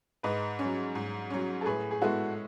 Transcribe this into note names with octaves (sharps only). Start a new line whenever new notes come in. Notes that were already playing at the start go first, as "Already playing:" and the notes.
G#2 B4 D#5
C#4
F#3
G#2
F#3 C#4
A4
A2 G#4 B4
G#4
G#3 B3 E4 F#4 A4